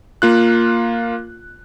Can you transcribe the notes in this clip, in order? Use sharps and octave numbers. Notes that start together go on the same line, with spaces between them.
A#3 F4 F#6